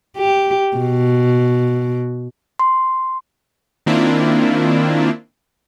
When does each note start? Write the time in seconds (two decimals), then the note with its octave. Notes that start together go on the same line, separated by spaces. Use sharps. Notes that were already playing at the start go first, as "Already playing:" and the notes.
0.17 G4
0.77 B2
2.59 C6
3.86 D#3 A#3 C4 D4 E4 F4